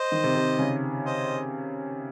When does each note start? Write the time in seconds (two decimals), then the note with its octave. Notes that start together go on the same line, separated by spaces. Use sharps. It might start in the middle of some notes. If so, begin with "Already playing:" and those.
Already playing: C5 D#5
0.12 D#3
0.24 C3
0.35 C3
0.59 C#3
1.06 C5 D#5